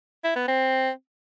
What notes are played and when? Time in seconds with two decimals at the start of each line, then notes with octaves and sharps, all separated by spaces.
0.24 E4
0.36 B3
0.48 C4